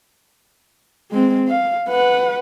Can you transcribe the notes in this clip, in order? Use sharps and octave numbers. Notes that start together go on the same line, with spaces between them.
G#3 C4
F5
B4 F#5